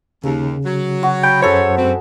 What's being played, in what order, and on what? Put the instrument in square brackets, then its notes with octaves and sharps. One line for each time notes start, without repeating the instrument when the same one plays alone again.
[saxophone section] D#2 [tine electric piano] C#3
[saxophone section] F#3
[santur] F#4
[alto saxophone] G5 [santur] B5
[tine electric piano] F#2 C5 [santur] G#4 A4 E5 [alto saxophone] C#5
[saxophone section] B2 G#3 F#4 [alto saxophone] C4